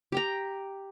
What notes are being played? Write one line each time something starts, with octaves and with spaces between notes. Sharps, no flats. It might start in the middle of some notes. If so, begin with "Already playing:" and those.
G4 G5 A#5